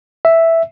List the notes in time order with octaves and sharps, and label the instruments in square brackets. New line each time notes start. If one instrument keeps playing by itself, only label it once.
[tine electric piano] E5